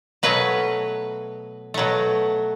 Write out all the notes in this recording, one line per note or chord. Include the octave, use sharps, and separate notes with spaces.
B2 F#3 A3 B4
B2 F#3 A3